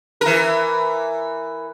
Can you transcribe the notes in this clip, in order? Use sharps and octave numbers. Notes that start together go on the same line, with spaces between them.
E3 A#4